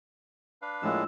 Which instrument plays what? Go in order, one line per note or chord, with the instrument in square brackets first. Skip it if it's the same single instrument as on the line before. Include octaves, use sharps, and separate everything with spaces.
[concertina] D4 B4 F5
[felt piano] A#1 A#3 F4 [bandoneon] A2 G#3 [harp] E6